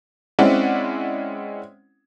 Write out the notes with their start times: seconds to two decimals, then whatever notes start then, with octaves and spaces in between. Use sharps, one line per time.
0.39 G#3 C4 C#4 E4 D5 F#5